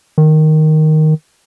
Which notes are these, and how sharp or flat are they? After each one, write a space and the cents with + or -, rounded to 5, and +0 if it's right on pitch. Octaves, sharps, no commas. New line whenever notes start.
D#3 +0